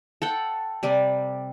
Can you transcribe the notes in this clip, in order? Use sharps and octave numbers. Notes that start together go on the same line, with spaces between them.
A4 F#5 G5
C3 G3 D5